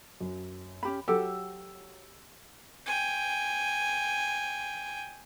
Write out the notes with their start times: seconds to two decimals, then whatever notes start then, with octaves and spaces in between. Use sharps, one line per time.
0.21 F#2
0.83 C#4 G4 B5
1.08 F#3 G4 A4 F#5 E6
2.86 G5 G#5